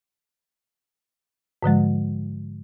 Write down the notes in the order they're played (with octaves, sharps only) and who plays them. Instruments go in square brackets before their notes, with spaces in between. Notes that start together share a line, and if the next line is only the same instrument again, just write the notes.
[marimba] G#2 D3 F3 G#3